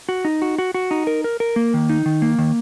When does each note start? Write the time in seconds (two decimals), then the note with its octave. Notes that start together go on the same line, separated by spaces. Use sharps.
0.09 F#4
0.25 D#4
0.42 F#4
0.58 F#4
0.74 F#4
0.91 D#4
1.07 A#4
1.24 A#4
1.40 A#4
1.56 A#3
1.74 D#3
1.89 D#4
2.06 D#3
2.22 A#3
2.38 D#3